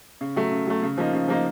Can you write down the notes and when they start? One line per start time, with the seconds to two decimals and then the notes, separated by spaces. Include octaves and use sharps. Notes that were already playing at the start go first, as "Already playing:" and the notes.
0.21 C#3
0.36 F#3 A3
0.52 C#3
0.67 F#3 A3
0.82 C#3
0.98 F3 A#3 D#4
1.13 C#3
1.28 F3 A#3 D#4